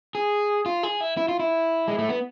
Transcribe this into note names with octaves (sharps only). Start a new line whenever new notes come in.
G#4
F4
G#4
E4
E4
F4
E4
G#3
A3
B3